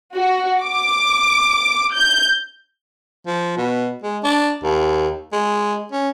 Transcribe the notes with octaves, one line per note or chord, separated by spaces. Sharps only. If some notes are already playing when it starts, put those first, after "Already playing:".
F#4
D6
G6
F3
B2
G#3
D4
D#2
G#3
C#4